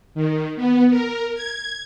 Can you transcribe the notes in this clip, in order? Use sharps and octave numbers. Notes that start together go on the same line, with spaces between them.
D#3
B3
A#4
G#6